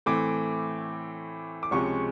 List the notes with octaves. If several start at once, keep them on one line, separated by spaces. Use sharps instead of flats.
A2 E3 A3 C4 D6
D6
C#2 C3 F3 G#3 C#4 C#6